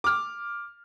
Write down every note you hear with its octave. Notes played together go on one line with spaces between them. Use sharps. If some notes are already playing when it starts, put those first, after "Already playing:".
D6 F6